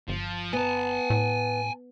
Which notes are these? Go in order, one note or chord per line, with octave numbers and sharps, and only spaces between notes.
G1 F3
B3 G#5 A5
A2